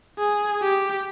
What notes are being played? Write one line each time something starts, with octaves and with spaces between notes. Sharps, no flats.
G#4
G4